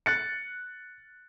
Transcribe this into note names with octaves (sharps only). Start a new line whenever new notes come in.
F#6 A6 C#7